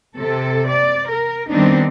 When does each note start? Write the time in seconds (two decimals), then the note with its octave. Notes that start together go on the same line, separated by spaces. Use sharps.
0.16 C3 A4
0.67 D5
1.07 A#4
1.49 D#3 G3 B3 C4 D4 D#4